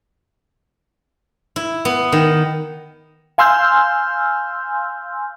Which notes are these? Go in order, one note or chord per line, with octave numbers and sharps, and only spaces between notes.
E4
B3
D#3
F5 G#5 C6 E6 F6 G6